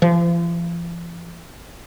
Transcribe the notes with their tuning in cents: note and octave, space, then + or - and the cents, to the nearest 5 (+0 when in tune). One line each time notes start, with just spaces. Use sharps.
F3 -40